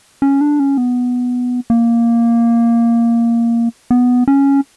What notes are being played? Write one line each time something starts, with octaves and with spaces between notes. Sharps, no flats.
C#4
D4
C#4
B3
A#3
B3
C#4